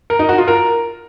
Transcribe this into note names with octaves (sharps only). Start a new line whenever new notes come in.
A#4
D#4
F#4
F4
A#4